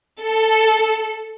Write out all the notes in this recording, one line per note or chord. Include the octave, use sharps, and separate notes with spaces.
A4